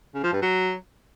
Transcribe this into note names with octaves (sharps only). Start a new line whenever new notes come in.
C#3
F3
G2
F#3